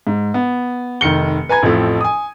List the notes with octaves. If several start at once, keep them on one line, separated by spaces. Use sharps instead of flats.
G#2
B3
F1 D#3 C#7 G7
B4 G#5 A#5 G#6
A1 F2 F3 A3
G#5 D#6